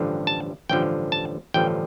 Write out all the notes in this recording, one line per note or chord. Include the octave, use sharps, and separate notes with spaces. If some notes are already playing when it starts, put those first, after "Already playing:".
Already playing: A1 G2 D3 F3
A5
A1 G2 D3 F3 G5
A5
A1 G2 D3 F3 G5